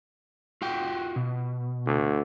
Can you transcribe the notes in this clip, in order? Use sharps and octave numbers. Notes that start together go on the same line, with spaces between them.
F4 F#4 G5
B2
D2